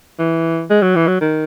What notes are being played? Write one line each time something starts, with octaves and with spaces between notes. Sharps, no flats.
E3
G#3
F#3
E3
F#3
D#3